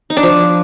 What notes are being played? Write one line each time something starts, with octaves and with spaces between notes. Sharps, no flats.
D#4
D4
F3